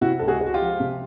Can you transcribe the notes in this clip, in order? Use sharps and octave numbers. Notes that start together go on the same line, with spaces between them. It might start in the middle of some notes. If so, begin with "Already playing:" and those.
C3 E4 F#4
C#2 A4
F#4 G#4
G#3
F#4
F4 G4
F3
C3